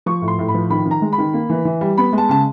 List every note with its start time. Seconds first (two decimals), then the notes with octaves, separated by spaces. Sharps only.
0.06 F3 C#6
0.22 A2
0.28 C6
0.39 A2
0.48 B5
0.54 F3
0.70 D#3 B5
0.86 D#3
0.91 A#5
1.02 G#3
1.13 B5
1.18 D#3
1.34 A#3
1.50 E3
1.65 E3
1.81 G3
1.98 B3 B5
2.13 G#3
2.18 A5
2.29 C#3 A5